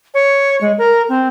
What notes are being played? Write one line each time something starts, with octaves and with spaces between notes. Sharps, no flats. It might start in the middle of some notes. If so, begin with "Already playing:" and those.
C#5
G#3
A#4
C4